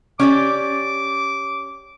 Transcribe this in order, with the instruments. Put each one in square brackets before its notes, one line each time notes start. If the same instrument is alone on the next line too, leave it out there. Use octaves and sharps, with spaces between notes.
[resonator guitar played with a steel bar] C#4 G4 D5 [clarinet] D6